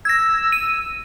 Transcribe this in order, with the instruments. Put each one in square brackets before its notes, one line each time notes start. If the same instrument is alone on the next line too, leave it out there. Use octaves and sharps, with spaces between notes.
[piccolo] E6 [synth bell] G#6 A#6
[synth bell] D#7